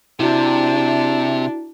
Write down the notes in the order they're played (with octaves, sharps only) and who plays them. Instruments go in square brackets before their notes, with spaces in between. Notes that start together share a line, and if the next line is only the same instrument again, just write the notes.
[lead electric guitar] C3 [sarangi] D4 [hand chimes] E4 F#4